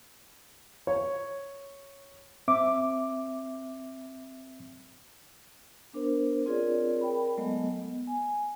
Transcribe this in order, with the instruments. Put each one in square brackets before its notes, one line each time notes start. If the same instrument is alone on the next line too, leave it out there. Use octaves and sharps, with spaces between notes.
[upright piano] C#5
[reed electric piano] C4 E5 D6
[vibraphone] B3 D4 A#4 C5
C4 F4 G#4 A#4 C#5 D5
A#4 G5 B5
F#3 G#3 A3 B3 A4 D#5
B3
G#5